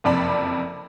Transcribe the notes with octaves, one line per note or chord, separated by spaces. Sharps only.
F#1 F2 C3 D5 A5 B5